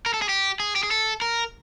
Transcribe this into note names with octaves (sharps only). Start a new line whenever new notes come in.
A#4
A4
G#4
G4
G#4
G4
G#4
A4
A#4